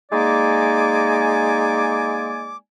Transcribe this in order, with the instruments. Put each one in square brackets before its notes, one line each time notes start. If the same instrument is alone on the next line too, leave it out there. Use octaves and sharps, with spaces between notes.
[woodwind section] G#3 A#3 D#4 D5 G#5 D6